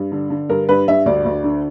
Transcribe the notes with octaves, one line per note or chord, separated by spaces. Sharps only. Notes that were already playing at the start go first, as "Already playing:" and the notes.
Already playing: G2
D3
D3
G2 A#4
G2 B4
G2 E5
D2 D5
D2
D3